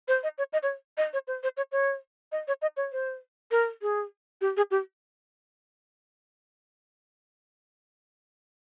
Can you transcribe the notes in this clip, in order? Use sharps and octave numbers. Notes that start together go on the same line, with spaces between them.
C5
D#5
C#5
D#5
C#5
D#5
C#5
C5
C5
C#5
C#5
D#5
C#5
D#5
C#5
C5
A#4
G#4
G4
G#4
G4